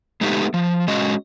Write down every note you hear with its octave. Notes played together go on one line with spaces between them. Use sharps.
G#3 A3 B3 D#4 G4
F3
G#3 C#4 F#4 D#5